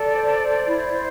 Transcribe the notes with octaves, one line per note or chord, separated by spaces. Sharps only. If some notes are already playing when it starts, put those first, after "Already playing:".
Already playing: A4 D5
C5
C5
E4
C5